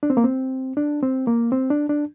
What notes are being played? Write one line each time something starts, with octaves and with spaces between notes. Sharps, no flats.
D4
C4
A#3
C4
D4
C4
A#3
C4
D4
D4